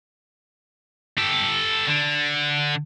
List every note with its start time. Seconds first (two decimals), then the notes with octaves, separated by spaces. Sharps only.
1.18 G4 A4
1.88 D3